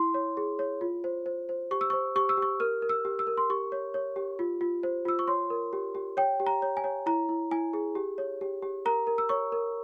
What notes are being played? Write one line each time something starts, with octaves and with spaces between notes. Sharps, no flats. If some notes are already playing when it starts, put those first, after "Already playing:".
Already playing: E4 C6
C#5
G#4
C#5
F4
C5
C5
C5
G4 C#6
E6
C#6
C5
G4 C#6
E6
G4
C#6
A#4 F6
A#4
E6
G4
E6
A#4
C6
G4 C#6
C#5
C#5
G4
F4
F4
C5
F4 E6
C#6
C#5 C6
A#4
G4
G4
C#5 G5
G4
A#5
C#5
G#5
C#5
E4 A#5
E4
E4 G#5
G#4
G4
C#5
G4
G4
A#4 A#5
A#4
E6
C#5 C#6
A#4